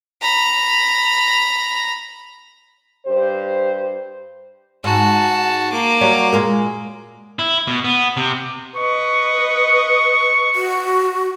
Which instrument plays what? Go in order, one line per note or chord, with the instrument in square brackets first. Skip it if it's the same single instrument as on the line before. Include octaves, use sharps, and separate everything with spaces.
[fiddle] A#5 B5
[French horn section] G2 G4 C5
[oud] G#2 [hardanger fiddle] F#4 A5
[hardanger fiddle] A#3 D6
[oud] F#3 G3 C#5
A#2 G#3 A#4
[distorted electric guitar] E4
B2
B3
C3
[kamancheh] B4 D#5 [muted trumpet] C#6
[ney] F#4